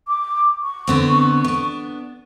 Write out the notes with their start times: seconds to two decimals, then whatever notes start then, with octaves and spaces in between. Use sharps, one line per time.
0.08 D6
0.62 C#6
0.87 D3 B3 C4
1.44 B3 D4